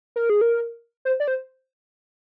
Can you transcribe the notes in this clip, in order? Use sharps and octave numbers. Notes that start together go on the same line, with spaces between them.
A#4
G#4
A#4
C5
D5
C5